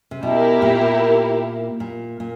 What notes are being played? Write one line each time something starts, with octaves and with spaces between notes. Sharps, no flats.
C3
B2 E4 G4 A#4
A#2
A#2
A#2